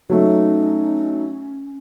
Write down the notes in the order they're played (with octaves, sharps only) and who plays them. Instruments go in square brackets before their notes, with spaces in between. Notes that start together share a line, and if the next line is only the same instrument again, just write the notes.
[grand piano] F#3 A3 [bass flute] C#4 [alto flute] D#4